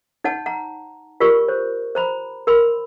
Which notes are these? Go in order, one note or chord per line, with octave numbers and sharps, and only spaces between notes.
D#4 C#5 F#5 A5
F#5 A#5
F4 G4 A#4 D5 C#6
C5 C#5
C5 A#5 B5
A#4 B5 C6